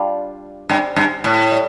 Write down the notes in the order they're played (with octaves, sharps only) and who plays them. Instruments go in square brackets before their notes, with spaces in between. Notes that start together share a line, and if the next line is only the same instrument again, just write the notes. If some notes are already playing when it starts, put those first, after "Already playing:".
Already playing: [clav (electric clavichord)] G3 D4 F4
[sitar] G2 [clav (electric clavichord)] G3 C4 G4
[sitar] G2
A2
[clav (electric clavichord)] G3